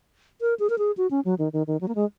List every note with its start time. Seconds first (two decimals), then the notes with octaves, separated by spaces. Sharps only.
0.41 A#4
0.60 G#4
0.70 A#4
0.78 G#4
0.97 F#4
1.11 C#4
1.25 F#3
1.39 D#3
1.53 D#3
1.67 D#3
1.81 F#3
1.88 A#3
1.95 G#3